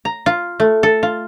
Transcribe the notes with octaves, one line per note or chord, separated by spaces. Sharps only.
A#5
F4
A3
A4
F4